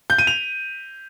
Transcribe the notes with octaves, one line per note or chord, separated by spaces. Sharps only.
G6
D#7
F7